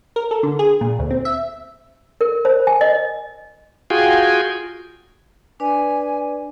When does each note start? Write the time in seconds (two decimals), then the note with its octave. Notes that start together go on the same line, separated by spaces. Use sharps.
0.16 A#4
0.31 A4
0.43 D3
0.59 G#4
0.81 A#2
0.99 D2
1.11 C4
1.25 E5
2.21 A#4
2.45 C5
2.67 G#5
2.81 D#5
3.90 F4 F#4 G#4 G5 G#5
5.60 D4 B4 D5 G#5